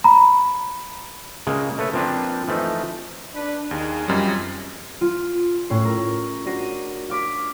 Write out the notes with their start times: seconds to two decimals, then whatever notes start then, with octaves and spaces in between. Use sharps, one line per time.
0.04 A#5 B5
1.47 C#3 G#3 A#3
1.78 A3 A4 B4 C#5
1.94 F3 A#3 C4 D4 B4
2.48 E3 F3 A3 D#4
3.34 D4 B4
3.71 D#2 D#4 G#4 A#4
4.08 F#2 F3 G3 C4 D#5
5.01 F4
5.70 A2 C#4 G#4 C7
5.85 A#4
6.46 D4 F#4 A#6 C7 D#7
7.10 F5 D6 B6